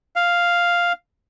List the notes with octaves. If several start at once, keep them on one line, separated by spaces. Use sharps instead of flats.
F5